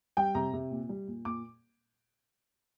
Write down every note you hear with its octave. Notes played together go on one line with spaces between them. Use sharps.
G3 G5
C3 A#5
C3
A#2
G3
A#2
A#2 D6